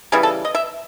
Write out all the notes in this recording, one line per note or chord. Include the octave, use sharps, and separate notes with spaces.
C#3 E3 G3 G#4
A4
D#5
E5